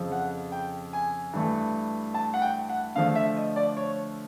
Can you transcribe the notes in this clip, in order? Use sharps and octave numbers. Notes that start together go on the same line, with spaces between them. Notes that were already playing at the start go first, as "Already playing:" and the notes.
Already playing: F2 C#3 F3
F#5
G5
G#5
G2 E3 A3
A5
F#5
G5
F#5
D3 F3 A3 F5
E5
D#5
D5
C#5